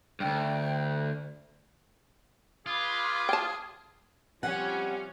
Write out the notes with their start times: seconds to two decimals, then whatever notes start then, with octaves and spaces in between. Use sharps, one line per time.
0.20 D2 G2 G5
2.66 F4 G#4 B4 B5 D6
3.29 G5 A5
4.43 C3 F3 G3 C#4 G4 F#5